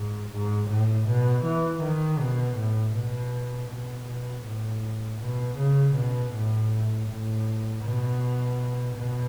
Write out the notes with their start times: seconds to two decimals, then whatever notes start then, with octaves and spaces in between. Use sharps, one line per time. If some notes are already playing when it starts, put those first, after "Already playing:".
Already playing: G#2
0.31 G#2
0.69 A2
1.07 B2
1.45 E3
1.83 D#3
2.20 B2
2.57 A2
2.95 B2
3.70 B2
4.07 B2
4.45 A2
5.20 B2
5.58 C#3
5.96 B2
6.34 A2
7.08 A2
7.84 B2
8.96 B2